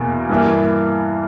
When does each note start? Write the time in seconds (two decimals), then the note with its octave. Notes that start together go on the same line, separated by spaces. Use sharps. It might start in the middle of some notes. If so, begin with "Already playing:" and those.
Already playing: E2 B2 A#3
0.29 G2 E3 A#3